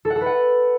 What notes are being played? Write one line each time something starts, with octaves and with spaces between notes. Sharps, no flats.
A4
F#5
A4
B4
F#5